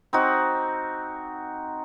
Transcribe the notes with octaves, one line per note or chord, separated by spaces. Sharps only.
C4 D#4 F#4